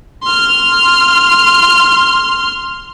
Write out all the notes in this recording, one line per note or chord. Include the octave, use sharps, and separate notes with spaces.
C6 F6